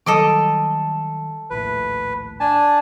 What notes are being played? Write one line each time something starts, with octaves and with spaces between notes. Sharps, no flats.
D#3 F#3 G3 A4 D#5 D6
A#1 D#2 A2 B4
D4 G#5 A5